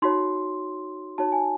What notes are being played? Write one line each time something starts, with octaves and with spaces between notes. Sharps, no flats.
D#4 F#4 C#5 C6
D#4 F#4 C#5 A5
G#5